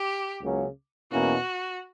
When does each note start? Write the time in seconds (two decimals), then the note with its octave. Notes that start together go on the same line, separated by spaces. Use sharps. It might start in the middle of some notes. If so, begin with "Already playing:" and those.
Already playing: G4
0.42 C#2 C#3 F#3 A#3 C#4
1.11 E2 B2 A#3 C#4 E4 F#4